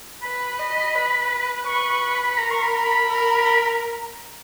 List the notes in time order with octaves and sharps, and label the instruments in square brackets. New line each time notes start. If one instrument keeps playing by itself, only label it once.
[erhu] B4 [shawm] B5
[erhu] D#5
B4
[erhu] B4 [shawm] C#6
[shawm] C#6
B5
B5
[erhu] A#4 [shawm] A#5
[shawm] C#6
B5
B5
[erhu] A#4